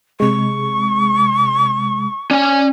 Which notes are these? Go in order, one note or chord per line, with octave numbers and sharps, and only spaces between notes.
C3 G#3 C#6
C#4 D5 G#5